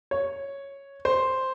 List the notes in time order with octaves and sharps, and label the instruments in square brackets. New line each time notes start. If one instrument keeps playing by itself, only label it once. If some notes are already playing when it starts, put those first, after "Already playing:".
[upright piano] C#5
C5